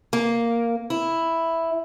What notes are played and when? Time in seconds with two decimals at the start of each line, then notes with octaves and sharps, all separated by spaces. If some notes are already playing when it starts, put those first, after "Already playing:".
0.13 A#3
0.90 E4